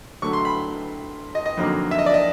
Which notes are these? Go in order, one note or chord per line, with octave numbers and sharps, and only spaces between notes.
D3 F#3 A3 C#6
C6
B5
D#5
D#5
F2 D3 F#3 A#3 D#4
E5
D#5
D5
D#5